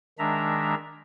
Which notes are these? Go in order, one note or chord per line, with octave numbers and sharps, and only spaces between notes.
D#3 G#3 D4 E5 A#5